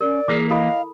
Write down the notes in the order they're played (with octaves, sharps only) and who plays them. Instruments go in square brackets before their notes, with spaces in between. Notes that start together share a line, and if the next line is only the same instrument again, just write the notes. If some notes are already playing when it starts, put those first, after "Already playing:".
[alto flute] C#4 [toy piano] A#4 [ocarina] D5
[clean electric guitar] E3 A#3 [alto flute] G#4 [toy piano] D6
[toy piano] E4 A4 B5 [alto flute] D#5 [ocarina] F5